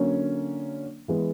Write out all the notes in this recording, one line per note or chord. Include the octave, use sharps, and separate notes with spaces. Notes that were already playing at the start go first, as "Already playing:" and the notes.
Already playing: D3 F#3 A#3 C#4
E3 G#3 B3